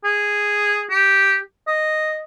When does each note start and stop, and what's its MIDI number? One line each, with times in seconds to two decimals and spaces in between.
0.05 0.85 68
0.90 1.38 67
1.67 2.24 75